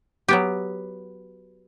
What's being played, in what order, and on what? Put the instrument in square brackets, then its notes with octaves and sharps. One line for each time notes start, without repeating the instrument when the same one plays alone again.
[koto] F#3 B3 G4